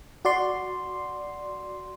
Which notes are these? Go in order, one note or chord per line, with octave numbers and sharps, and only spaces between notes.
F#4 D5 C6